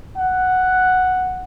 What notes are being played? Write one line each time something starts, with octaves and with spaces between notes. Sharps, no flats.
F#5